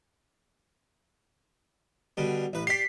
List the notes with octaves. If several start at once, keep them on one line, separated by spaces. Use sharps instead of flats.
B2 D3 G3
A1 B4
G4 D5 B6 C7